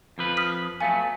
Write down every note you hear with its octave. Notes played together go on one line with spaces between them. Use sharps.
F2 F3 B4
D#6 F6 B6
F#3 A3 B3 F5 G#5